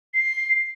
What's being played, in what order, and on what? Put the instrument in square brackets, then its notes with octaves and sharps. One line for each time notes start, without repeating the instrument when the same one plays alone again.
[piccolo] C7